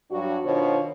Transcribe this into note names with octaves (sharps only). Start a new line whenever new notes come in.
G2 F#3 D4 F#4
B2 D#3 D4 F4 C5 C#5